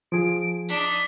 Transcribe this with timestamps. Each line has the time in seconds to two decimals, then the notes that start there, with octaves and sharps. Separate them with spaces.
0.12 F3 G#4 D7
0.69 D4 D#4 B6